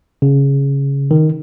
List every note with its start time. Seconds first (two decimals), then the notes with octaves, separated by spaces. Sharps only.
0.22 C#3
1.11 D#3